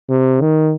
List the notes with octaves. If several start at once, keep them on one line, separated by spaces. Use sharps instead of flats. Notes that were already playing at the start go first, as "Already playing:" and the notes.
C3
D#3